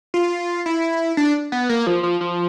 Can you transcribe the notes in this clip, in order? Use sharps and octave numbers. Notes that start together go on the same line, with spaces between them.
F4
E4
D4
B3
A#3
F3
F3
F3